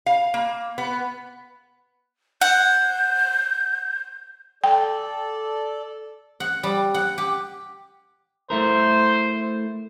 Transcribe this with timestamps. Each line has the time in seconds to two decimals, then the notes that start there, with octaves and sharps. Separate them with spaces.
0.06 F5
0.34 A#3
0.78 B3
2.41 F#5 G6
4.64 A4 D5 G5
6.40 F#5
6.63 G3
6.94 F#5
7.18 G4
8.50 A3 E4 A#4 C5